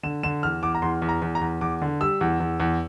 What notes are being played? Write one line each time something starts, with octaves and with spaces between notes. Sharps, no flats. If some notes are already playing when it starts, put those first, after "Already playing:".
D3 E7
D3 E7
E2 F6
E2 D6
A#5
E2 C6
E2
A#5
E2
A#5
E2
E2 D6
D3
G3 E6
E2
E2
E2